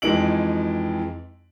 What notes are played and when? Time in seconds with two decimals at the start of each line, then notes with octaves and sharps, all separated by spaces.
0.02 F2 E3 G#3 D#4 D7 F#7